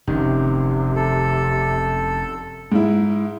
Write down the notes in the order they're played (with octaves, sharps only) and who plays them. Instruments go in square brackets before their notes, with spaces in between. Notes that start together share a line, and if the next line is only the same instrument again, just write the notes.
[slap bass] F1 [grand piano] C2 F#2 D#3 [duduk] C3
[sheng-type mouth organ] A4
[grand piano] G#2 E4